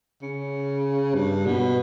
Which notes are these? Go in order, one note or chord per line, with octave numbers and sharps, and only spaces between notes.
C#3
G2
B2